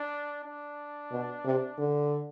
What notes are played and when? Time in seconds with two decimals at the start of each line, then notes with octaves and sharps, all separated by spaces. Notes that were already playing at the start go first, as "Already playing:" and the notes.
Already playing: D4
0.44 D4
1.12 B2
1.45 C3
1.78 D3